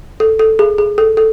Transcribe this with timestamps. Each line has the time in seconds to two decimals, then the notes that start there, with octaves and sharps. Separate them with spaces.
0.20 A4
0.39 A4
0.59 G#4
0.78 G#4
0.98 A4
1.17 A4